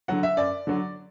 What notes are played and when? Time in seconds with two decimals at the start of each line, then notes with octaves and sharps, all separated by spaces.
0.08 D3 F#3 F#5
0.23 E5
0.37 F#2 D5
0.67 D3 F#3